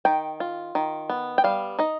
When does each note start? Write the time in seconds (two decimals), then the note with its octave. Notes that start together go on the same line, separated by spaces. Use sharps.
0.05 D#3 G5
0.40 F4
0.75 D#3
1.09 B3
1.38 G5
1.44 G3 F5
1.79 D#4 D#5